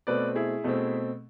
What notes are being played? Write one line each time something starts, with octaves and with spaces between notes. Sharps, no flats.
B2 A3 C4 B4 D5
E4 G#4
B2 A3 C4